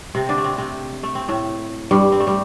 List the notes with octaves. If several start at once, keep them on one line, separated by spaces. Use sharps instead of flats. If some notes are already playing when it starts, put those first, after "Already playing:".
C3 C4
D3 D4
A3
C3 C4
C3 C4
A3
C4
A2 A3
G2 G3
C4
A3
G3